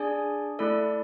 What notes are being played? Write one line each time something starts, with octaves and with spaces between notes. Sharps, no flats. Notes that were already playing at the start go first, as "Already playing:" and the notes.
Already playing: D4 G#4 D5 G#5
A3 E4 A4 D5